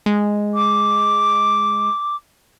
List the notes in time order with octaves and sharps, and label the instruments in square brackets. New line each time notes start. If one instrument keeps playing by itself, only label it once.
[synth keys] G#3
[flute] D6